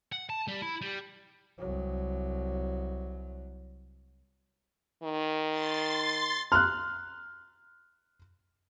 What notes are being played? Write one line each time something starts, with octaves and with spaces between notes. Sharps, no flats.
F#5
A5
G3
E4 B5
G3
C2 F#3
D#3
C6 A6
A#5 C6 F6 F#6